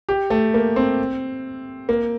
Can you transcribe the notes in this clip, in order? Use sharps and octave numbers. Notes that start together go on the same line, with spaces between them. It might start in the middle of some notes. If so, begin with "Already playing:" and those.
G4
A3
A#3
C4
A#3